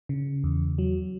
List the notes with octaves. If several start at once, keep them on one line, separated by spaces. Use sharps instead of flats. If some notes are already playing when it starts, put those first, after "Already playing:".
C#3
E2
F#3